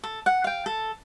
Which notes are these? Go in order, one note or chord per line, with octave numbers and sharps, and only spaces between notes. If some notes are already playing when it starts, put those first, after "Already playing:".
A4
F#5
F5 G5
A4